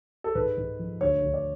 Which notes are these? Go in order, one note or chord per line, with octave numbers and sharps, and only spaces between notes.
A4
G#2 B4
G#2
F3
D2 C#5
D2
D5